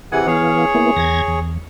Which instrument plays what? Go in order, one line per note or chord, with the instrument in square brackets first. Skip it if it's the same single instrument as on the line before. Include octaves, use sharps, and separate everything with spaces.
[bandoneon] C3 E3 F#5 [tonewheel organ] G#4 G#5
[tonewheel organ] E3 B3 F5 [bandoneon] G#4 C#5
[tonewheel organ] A#3 B3 E4
E2 G#6 A#6
E2